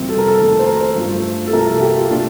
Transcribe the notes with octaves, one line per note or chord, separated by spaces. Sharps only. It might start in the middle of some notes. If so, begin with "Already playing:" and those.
Already playing: F2 C3 G3 A#3 C4
A4
A#4
A4
F2 D#3 A3
C5
A#4
C5
G2 F3 A3
A4
C2 C3 F3 A#3 A#4
A4
G4
F4
A#2 A3 D4